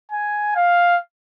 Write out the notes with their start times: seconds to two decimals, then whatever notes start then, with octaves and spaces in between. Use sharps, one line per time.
0.12 G#5
0.56 F5